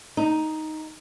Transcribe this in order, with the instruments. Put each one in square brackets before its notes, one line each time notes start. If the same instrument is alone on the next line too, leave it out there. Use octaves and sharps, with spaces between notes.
[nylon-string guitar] D#4